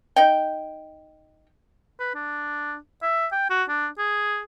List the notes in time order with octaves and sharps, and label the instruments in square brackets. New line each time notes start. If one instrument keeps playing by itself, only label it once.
[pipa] D#4 G5
[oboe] B4
D4
E5
G5
F#4
D4
G#4